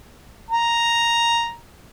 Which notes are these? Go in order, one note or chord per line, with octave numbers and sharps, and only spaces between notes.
A#5